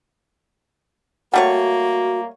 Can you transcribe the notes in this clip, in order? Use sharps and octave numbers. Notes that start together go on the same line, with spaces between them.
G3 A3 A#3 F#4 C#5 F#5